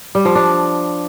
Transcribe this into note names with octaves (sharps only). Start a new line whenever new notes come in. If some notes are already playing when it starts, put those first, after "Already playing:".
G3
F3
D4